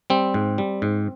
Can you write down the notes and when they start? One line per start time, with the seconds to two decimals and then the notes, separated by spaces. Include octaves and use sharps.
0.10 G3 C4
0.34 G#2
0.58 G3
0.82 G#2